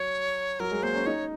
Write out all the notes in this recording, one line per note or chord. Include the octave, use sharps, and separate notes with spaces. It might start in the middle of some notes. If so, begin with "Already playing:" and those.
Already playing: F#3 C#5
F#3 A#4
G#3
A#3 C5
C#4
D#4 C#5